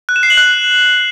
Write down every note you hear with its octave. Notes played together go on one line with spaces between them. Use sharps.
F#6
E7
C7
F#7
F#6